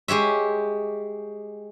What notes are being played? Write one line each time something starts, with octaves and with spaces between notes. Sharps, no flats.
G#3 G4 C#5 E5